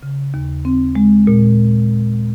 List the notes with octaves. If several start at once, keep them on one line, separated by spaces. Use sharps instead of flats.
C#3
D#2
C4
G#3
A#2